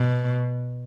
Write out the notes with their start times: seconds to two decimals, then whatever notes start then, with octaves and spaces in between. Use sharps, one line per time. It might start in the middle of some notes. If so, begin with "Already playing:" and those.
Already playing: B2